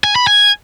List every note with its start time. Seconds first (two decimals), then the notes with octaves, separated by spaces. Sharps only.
0.04 G#5
0.16 B5
0.27 G#5